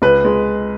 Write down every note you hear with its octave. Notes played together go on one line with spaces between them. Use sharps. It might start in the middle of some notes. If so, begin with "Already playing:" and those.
C#2 B4
G#3